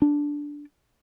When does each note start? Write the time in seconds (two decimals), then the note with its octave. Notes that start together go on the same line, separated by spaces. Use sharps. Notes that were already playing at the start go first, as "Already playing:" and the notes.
0.02 D4